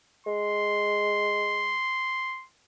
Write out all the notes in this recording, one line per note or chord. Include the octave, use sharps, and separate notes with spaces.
G#3 C6